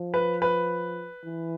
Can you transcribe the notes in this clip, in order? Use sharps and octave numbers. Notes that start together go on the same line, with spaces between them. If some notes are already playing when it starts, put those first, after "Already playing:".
Already playing: F3
B4
B4
E3